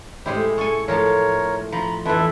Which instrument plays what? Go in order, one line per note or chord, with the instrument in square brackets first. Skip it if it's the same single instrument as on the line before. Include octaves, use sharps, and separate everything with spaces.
[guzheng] A2 G#3 E4 [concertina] G4 C5
[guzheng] A4 G#5 [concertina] C#6
[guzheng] A2 F3 A5 [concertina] A#4 C#5
[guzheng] F3 [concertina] A#5 B5
[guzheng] F2 E3 [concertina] A4 B4 E5